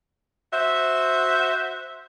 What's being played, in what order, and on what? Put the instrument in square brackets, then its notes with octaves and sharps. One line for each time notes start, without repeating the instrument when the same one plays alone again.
[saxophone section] F#4 C5 E5